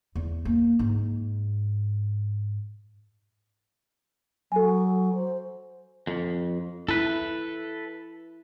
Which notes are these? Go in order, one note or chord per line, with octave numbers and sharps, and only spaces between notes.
E2
A#3
G#2
F#3 A4 G#5
C5
F2
E4 A4 B4